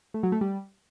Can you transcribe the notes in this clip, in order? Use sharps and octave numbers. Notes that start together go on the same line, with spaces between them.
A3
F#3
A3
G3